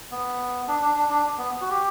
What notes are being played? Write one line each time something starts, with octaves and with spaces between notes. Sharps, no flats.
B3
D4
D4
D4
D4
B3
F#4
G4